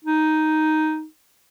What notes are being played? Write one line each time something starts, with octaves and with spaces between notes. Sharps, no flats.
D#4